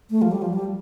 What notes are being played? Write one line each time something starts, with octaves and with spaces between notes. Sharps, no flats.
A3
F3
G3
F3
G3